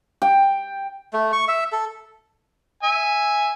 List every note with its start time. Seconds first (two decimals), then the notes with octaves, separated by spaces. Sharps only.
0.22 G5
1.13 A3
1.33 C#6
1.48 E5
1.72 A4
2.83 E5 G#5